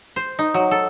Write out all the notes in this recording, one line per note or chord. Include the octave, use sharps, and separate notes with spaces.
C5
D#4
F#3
A4